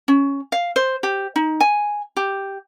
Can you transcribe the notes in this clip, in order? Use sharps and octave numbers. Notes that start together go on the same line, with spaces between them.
C#4
F5
C5
G4
D#4
G#5
G4